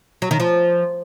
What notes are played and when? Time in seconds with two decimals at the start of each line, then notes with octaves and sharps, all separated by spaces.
0.22 F#3
0.31 D#3
0.40 F3